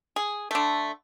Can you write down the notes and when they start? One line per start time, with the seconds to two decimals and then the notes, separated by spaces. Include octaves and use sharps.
0.16 G#4
0.51 D3 A3